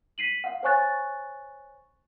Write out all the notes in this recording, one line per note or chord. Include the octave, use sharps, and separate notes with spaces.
B6 C7 D#7 F#7
F5 F#5
C5 C#5 G#5 C#6 F#6 A6